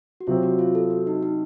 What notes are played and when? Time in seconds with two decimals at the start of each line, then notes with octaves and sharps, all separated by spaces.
0.20 F#4
0.27 C3 F#3 C4 F4
0.43 F#4
0.59 F4
0.75 A4
0.90 F#4
1.07 D#4
1.23 D#4